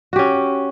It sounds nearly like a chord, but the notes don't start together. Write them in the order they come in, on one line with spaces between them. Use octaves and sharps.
F#4 G4 C#4